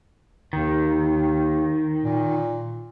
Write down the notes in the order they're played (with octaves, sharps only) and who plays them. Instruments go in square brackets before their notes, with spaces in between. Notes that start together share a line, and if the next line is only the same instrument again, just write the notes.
[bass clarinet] D#2 [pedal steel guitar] D#3
[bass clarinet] A#2